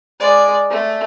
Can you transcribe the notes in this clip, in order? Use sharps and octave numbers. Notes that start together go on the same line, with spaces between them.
G#3 D5
A3